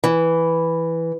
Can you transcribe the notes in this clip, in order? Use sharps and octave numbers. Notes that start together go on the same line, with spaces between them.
E3